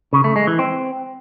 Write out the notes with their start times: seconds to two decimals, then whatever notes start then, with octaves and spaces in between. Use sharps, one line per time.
0.13 C#3
0.24 A3
0.36 G#3
0.47 E3
0.59 C4